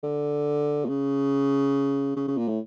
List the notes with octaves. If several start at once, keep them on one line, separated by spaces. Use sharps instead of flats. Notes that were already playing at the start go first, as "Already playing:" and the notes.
D3
A#2
C#3
C#3
C#3
A#2
A2